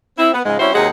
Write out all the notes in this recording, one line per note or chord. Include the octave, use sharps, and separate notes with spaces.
C4 E4
B3
G#2 C#3 F3 G#3
G3 C4 C#4 E4 F#4 C5
D#2 C3 F#3 G#3 G#4 F#5